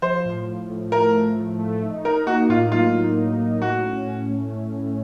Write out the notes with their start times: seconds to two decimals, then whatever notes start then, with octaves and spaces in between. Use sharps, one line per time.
0.02 F3 C5
0.25 A2
0.48 A2
0.70 A2
0.92 A3 A#4
1.14 A2
1.37 A2
1.59 A3
1.83 D#4
2.04 D#4 A#4
2.26 A#3 F#4
2.49 A2 F4
2.72 F#3 F4
2.95 D#4
3.18 D#4
3.40 D#4
3.62 A2 F#4
3.85 C#4
4.06 A2
4.29 A3
4.52 A2
4.74 A2